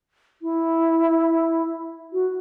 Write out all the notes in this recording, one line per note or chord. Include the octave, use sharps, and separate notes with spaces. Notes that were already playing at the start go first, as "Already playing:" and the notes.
E4
F#4